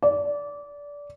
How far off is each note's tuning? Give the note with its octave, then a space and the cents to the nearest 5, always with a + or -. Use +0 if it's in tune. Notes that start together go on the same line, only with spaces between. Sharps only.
D5 -20